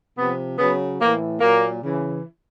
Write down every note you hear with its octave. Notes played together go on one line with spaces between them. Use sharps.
C3 F3 B3
C#3 F#3 B3
A2 E3 A#3
A#2 F#3 A#3
C#3 E3